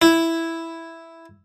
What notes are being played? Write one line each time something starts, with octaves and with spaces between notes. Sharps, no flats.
E4